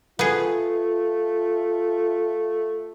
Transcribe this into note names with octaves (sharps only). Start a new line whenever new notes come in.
A3 B3 F4 G#4